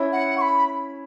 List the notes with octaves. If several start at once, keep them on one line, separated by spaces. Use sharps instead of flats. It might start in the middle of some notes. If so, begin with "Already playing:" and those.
Already playing: C#4 E4
F#5
C#6
B5